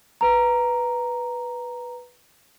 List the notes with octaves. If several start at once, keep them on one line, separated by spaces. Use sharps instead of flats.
B4 A#5